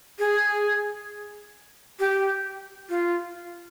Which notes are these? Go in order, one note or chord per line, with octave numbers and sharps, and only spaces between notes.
G#4
G4
F4